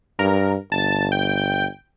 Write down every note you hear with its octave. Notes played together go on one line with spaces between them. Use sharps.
G2 A#4
G1 A5
G5